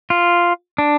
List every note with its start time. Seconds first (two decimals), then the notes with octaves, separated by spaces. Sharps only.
0.10 F4
0.78 D4